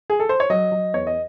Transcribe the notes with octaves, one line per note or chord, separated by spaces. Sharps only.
G#4
A4
C5
C#5
F#3 D#5
F#3
E2 C#5
D#5